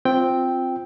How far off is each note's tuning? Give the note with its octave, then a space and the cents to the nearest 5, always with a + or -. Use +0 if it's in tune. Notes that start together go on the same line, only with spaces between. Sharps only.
C4 +0 F4 +0 G5 +0